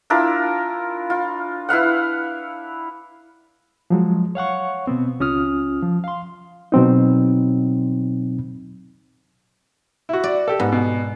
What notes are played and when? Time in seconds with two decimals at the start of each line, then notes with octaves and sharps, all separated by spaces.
0.10 D4 E4 F4 A#4
1.10 F4
1.69 E4 B4 F5 F#5
3.90 F3 F#3 G#3
4.35 C#5 F5 F#5 C#6
4.87 B2 B3 C4
5.20 C#2 C#4 F4 D#6 F6
5.83 F3
6.04 F5 C6
6.72 B2 F#3 C4 D#4
10.09 E4 F#4
10.24 D5
10.48 G4 A4
10.60 G#2 B3
10.72 B2